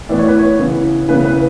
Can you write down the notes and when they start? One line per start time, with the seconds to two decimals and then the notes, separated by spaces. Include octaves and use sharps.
0.09 A2 E3 B3 D5
0.19 C#5
0.28 B4
0.39 C#5
0.59 C#3 E3 B3
1.09 C#3 E3 B3 B4
1.25 B4